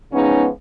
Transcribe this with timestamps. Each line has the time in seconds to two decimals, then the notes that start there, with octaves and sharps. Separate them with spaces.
0.12 C#3 F3 G#3 B3 C#4 D#4